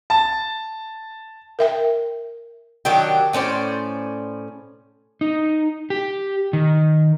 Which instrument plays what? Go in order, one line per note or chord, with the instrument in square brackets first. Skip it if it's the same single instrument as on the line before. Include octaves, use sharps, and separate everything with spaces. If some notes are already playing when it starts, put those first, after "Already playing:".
[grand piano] A5
[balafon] A#4 E5 G5
[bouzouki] D#3 F#3 D4 G4
A2 C#4 C5 D5
[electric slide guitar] D#4
G4
D#3